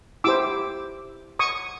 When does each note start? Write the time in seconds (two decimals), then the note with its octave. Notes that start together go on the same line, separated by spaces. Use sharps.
0.24 E4 G4 C5 D6 E6
1.39 C#6 D#6